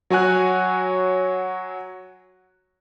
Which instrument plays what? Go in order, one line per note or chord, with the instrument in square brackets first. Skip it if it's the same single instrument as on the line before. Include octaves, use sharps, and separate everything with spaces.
[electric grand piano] F#3 F#4 C#5 G#5 F#6